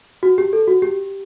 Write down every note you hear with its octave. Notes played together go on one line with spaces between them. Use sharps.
F#4
G4
A4
F#4
G4